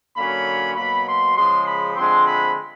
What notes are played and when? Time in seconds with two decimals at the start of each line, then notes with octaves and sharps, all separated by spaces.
0.16 D3 F#3 A#3 C#4 B5
0.76 B2 F#3 A#3 B5
1.06 C6
1.36 C#3 F3 G#3 C6
1.66 B5
1.96 D3 F3 G#3 C4 C6
2.26 B5